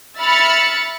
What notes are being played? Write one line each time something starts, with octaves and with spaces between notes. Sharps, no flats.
E5 B5 F6 A6 C#7